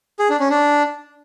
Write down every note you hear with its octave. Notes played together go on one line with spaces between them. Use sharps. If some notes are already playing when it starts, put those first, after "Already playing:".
G#4
D4
C#4
D4